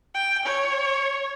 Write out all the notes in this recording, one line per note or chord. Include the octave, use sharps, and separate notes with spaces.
G5
C#5